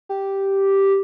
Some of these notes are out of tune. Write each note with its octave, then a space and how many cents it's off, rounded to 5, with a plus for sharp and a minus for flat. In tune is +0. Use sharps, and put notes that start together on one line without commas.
G4 -5